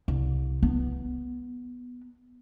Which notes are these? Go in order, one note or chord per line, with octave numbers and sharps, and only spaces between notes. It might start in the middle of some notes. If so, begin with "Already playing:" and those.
C2
B3